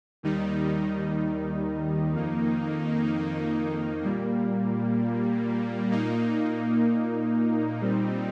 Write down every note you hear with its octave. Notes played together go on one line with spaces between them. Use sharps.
D#2 D#3 G3 D#4
F2 D#3 A#3 D#4
A#2 G3 A#3
A#2 A#3 D#4
A#2 G3 C4 D#4